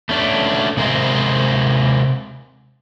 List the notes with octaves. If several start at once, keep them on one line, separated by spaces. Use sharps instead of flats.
A3 C#4 D4
C3 G#3 A#4 C5